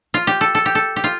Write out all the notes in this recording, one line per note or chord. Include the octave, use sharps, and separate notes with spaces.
F4
G4
A4
A4
G4
A4
G4
F4